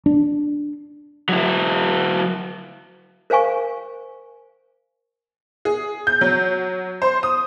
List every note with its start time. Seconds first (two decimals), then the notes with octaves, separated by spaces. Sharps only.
0.06 D4
1.29 F#3 E4
3.30 A#4 C5 F5 G#5 C#6
5.65 G#4
6.07 G6
6.21 F#3
7.02 C5
7.23 D#6